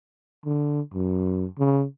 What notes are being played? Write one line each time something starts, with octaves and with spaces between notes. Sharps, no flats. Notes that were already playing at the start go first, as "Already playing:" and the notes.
D3
F#2
C#3